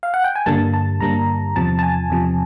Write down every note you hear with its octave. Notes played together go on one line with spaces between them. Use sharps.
F5
F#5
G5
G#5
G2 D3 G3 A#3 A5
A5
G2 D3 G3 A#3 A#5
E2 C3 F3 A5
A5
G#5
E2 C3 F3